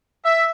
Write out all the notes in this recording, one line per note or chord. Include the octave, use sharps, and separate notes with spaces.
E5